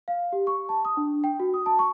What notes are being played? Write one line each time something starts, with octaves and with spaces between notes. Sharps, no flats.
F5
G4
C#6
A5
D#6
D4
G5
F#4
D#6
A5
C#6